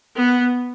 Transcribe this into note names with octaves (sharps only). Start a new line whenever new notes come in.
B3